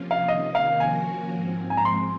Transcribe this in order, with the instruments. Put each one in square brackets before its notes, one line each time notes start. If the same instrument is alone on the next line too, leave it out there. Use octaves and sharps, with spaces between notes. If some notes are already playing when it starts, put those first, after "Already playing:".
Already playing: [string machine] C3 F3 A#3 C#4 F4
[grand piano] F5
[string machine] C3 D#3 A#3 C#4 [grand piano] D#5
[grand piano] F5
[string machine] F3 A#3 C#4 F#4 A#4 [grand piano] G#5
[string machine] G#2 F3 C4
[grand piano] G#5
A#5
[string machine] F3 G#3 C4 [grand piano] C6